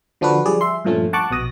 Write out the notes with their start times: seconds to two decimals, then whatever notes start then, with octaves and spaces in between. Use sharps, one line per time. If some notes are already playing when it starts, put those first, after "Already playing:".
0.21 D3 F3 D4 F#4 B4
0.45 F3 G3 G#4 D5
0.61 E5 C6
0.85 G2 A#2 F3 A3 C#4
1.13 F#5 A5 C#6 D6 F#6
1.31 A#1 B2 D#6 A#6